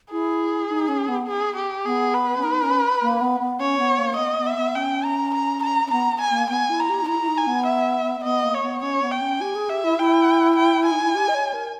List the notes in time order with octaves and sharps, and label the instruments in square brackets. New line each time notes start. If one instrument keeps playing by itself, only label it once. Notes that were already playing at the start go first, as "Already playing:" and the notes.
[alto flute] E4 [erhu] G#4
[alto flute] D#4
C#4
B3
[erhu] G#4
G4
[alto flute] B3 [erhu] G#4
[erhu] B4
[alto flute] C#4
D#4
C#4
A#3
B3
B3
[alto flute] C#4 [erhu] C#5
[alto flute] B3
A#3
[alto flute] B3 [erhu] D#5
[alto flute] B3
[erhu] E5
[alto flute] B3
[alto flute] C#4 [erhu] G5
[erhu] A#5
A#5
A#5
[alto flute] C#4
[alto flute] B3 [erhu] A#5
[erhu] G#5
[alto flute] A#3
[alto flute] B3 [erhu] G#5
[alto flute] E4
[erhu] A#5
[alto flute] G4
D#4
[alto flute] E4 [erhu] A#5
[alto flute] E4
D#4
[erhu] G#5
[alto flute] B3
[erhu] E5
[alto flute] B3 [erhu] D#5
[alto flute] A#3
[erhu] C#5
[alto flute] B3
[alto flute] C#4 [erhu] C#5
[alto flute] B3
[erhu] G5
[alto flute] C#4
[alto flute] G4 [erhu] G#5
[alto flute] G#4
[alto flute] G4 [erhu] E5
[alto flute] E4
[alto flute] E4 [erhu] G5
[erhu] G5
G#5
[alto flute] D#4
E4
G4
D#5
C#5
A#4